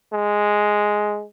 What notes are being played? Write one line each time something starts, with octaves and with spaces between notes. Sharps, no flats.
G#3